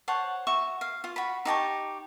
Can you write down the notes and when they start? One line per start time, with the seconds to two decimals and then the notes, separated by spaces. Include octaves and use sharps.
0.08 C5 C#5 F#5 A5
0.47 F#4 E5 C#6
0.81 F5
1.04 F4
1.16 F#4 B5
1.45 D#4 G4 A5 C#6